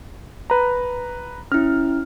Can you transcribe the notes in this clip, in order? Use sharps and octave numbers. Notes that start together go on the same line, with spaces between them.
B4 A#5
C#4 E4 F6